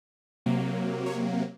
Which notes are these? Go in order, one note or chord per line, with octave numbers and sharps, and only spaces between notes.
C3 F#3 A#3
C#5